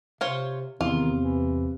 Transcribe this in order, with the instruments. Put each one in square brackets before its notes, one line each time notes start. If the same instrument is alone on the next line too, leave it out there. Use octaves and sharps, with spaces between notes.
[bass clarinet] C3 [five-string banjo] F4 C5 C#5
[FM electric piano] E2 [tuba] C3 [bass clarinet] D#3 [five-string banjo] F4
[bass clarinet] E3